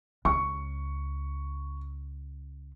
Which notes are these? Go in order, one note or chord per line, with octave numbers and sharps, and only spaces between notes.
C#2 C#6